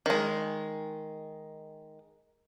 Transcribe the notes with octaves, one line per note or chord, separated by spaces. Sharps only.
D#3 G#3